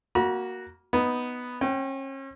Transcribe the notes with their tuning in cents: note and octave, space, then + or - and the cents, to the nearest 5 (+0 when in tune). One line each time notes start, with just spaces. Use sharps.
A#3 +0 F#4 +0 B5 -45
B3 +0 D#4 +0
C#4 -40 G5 -20